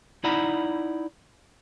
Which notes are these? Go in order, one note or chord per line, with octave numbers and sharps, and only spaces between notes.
D#4 E4 D5 F#5 A#5 B5